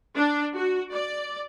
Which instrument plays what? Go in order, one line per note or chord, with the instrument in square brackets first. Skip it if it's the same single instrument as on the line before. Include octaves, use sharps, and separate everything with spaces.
[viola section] D4
F#4
D5